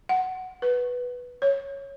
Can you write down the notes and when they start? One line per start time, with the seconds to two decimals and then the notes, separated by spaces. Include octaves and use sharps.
0.09 F#5
0.62 B4
1.42 C#5